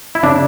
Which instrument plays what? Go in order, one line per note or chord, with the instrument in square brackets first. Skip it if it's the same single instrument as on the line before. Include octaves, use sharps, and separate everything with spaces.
[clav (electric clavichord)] E4
[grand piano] C#3 [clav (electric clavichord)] D4